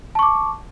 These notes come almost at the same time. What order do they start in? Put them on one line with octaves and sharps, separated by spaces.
A5 C#6 D6